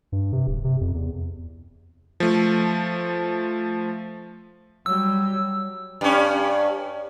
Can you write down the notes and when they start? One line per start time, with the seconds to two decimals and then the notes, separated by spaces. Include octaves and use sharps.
0.12 G2
0.33 C3
0.47 D1
0.64 C3
0.81 F2
0.94 E2
2.20 F3 A3
4.86 F#3 G3 E6
6.01 G2 C#4